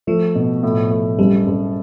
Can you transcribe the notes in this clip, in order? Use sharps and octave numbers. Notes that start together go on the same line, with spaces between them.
F3 A3
B2
A2
A2
F#1 G3
F#1